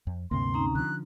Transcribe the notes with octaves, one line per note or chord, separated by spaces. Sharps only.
F2
D2 G2 C3 A#3 C6
C#4 D#4 A#5
D3 F3 F#6